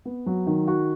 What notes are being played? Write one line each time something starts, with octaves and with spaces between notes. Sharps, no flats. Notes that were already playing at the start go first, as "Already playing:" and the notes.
B3
F#3
D#3
F#4